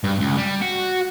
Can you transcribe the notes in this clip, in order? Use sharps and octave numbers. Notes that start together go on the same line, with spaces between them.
G2
C#2
G3
F#4